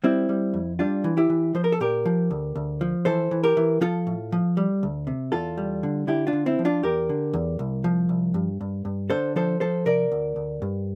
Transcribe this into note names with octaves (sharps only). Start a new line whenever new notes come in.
G3 C4 E4
G3
F2
G3 D4 F4
E3
E4 G4
E3
F3 C5
A#4
A4
A#2 G4 A#4
F3
D2
D2
F3
E3 A4 C5
E3
G4 A#4
E3
F3 F4 A4
A2
F3
G3
D2
C3
E2 F4 A4
G3
D3
D3 E4 G4
D4 F4
D3
C4 E4
F3
D4 F4
E2 G4 A#4
D3
E2
C2
F3
C2
G2
G2
G2
D3 A4 C5
F3 A4 C5
F3 A4 C5
C3 A#4 D5
D2
D2
G2